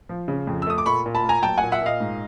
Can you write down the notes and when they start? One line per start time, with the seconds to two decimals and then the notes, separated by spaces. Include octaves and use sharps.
0.09 F3
0.28 C#3
0.47 F2
0.62 E6
0.67 A3 D#6
0.78 D6
0.86 A#2 B5 C#6
1.06 A#2
1.15 A5 B5
1.24 A#3
1.29 G#5 A#5
1.43 F#3 G5 A5
1.58 F#5 G#5
1.63 A#2
1.72 E5 F#5
1.82 A#2 D#5 F5
2.00 G#2